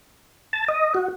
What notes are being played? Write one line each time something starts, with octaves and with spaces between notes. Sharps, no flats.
A5
D#5
F#4